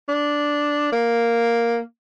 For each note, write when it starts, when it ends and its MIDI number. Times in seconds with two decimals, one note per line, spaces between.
0.08 0.90 62
0.92 1.79 58